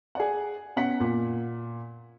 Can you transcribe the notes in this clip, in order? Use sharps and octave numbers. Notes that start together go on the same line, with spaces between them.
G#4 D5 F#5
B2 C#4 F#5 B6
A#2